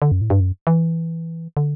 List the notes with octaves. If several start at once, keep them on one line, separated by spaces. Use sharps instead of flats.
D3
F#2
A2
G2
F#2
E3
D3